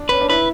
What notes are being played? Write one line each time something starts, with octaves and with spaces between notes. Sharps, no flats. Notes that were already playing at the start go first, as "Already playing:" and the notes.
Already playing: D4
C#4 B4
D4
E4 B4